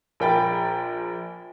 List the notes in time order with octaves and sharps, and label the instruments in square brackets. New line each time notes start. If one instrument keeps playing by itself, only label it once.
[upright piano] A#1 A#4 G5 B5 A6